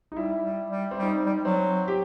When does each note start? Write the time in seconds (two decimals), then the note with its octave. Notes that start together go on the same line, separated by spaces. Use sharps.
0.12 D#4
0.16 G3 E4
0.45 G3
0.71 G3
0.91 C4
0.99 G3 D#4
1.26 G3
1.45 F#3 C4
1.88 G4